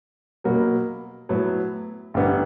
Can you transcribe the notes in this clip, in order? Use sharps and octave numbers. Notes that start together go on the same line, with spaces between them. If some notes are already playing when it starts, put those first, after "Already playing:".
B2 F#3 A#3
A2 F#3 B3
A1 G2 D3 G3 B3